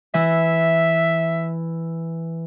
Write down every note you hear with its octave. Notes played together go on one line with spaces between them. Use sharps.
E3 E5